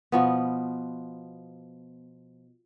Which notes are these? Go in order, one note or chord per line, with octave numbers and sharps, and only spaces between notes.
B2 F3 B3